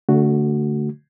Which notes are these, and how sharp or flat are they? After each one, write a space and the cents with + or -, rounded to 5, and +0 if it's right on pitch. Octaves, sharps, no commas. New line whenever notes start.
D3 -30 A3 +0 F#4 +0